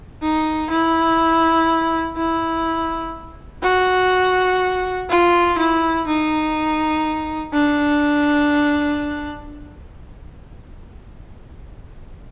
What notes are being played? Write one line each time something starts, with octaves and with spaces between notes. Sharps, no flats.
D#4
E4
E4
F#4
F4
E4
D#4
D4